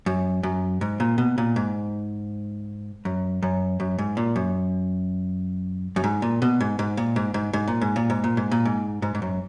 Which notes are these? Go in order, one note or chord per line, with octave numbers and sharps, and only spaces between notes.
F#2
F#2
G#2
A#2
B2
A#2
G#2
F#2
F#2
F#2
G#2
A#2
F#2
F#2
G#2
A#2
B2
G#2
G#2
A#2
G#2
G#2
G#2
A#2
G#2
A#2
G#2
A#2
G#2
A#2
G#2
G#2
G#2
F#2